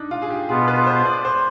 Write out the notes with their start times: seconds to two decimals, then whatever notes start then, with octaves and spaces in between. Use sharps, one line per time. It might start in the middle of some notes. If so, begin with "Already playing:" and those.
Already playing: D4 D#4
0.11 F4
0.22 G#4
0.30 G4
0.49 B2 B3 F4 G#4
0.68 B4
0.87 C5
1.05 D5
1.25 C5